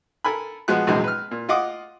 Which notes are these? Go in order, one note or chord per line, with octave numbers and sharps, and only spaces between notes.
A4 A#4 G#5 B5
F3 G#3 B3 F#4 F#6
A#1 E2 C3 F#3 G#3
B4 F6
A#2
F4 D#5 F#5 D6 D#6